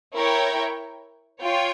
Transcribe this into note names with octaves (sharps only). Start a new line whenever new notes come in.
E4 A#4 C#5 G5
F4 C#5 G5